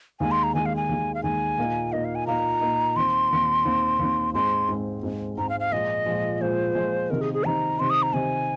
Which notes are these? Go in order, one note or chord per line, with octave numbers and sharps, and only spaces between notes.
D#2 D#3 G#3 G#5
C6
A#5
D#2 D#3 G#3 G#5
F5
G#5
D#2 D#3 G#3
F5
D#2 D#3 G#3 G#5
A#2 A#3 D#4
A#2 A#3 D#4 D#5
F5
G#5
A#2 A#3 D#4 A#5
A#2 A#3 D#4
D#2 D#3 C4 C6
D#2 D#3 C4
D#2 D#3 C4
D#2 D#3 C4
G#2 G#3 C4 C6
G#2 G#3 C4
G#2 G#3 C4
G#2 G#3 C4 A#5
F5
F5
A#2 F3 G#3 D#5
A#2 F3 G#3
A#2 F3 G#3 C5
A#2 F3 G#3
C3 D#3 C4 D#4 A#4
G#4
G#4
C3 D#3 C4 D#4 A#5
C3 D#3 C4 D#4 C6
D#6
A#5
C3 D#3 C4 D#4 G#5